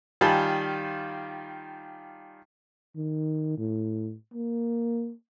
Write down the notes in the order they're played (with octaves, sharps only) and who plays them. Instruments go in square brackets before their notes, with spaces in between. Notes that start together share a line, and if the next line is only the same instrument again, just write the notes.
[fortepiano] D#3 G3 F4 G#5 A5 B5
[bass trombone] D#3
A2
A#3